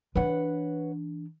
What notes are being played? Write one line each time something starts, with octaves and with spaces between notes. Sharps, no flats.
E3 D4 B4 C#5 F#5